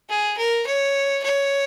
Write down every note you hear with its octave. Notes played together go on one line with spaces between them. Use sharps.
G#4
A#4
C#5
C#5